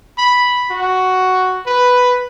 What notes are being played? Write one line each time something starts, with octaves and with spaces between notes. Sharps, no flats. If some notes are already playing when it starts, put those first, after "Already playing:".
B5
F#4
B4